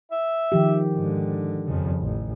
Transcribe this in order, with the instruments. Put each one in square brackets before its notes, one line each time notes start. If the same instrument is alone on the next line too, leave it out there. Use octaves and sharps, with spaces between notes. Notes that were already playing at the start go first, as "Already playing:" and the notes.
[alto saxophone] E5
[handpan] D#3 F3 G4
[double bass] G#2 [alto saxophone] D3
[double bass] F2 C#3
A1